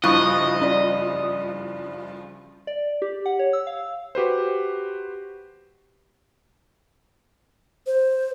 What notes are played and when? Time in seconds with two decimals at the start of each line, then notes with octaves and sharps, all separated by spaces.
0.04 F#1 G2 F3 E4 D#5 C#6 F#6
0.62 C#4 D5
2.67 D5
3.02 G4
3.26 F#5
3.39 C#5
3.53 E6
3.67 F5
4.15 F#4 G4 B4 C5
7.87 C5